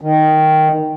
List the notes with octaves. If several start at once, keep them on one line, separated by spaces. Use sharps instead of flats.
D#3